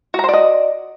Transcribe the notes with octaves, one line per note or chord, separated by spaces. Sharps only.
F#4 C5 D5 D#5 A#5